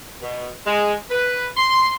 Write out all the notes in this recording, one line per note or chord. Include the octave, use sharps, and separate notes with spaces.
B2
G#3
B4
C6